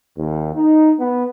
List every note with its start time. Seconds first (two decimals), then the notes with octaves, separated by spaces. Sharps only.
0.17 D#2
0.55 D#4
1.00 B3